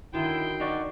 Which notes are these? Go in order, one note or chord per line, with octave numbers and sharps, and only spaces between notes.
D3 D#3 F#3 E4 G5 C6
D#4 F#4 D5 C#6